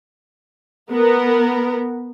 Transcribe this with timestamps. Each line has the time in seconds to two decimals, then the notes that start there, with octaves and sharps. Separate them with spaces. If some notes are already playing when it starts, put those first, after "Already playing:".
0.93 B3 A#4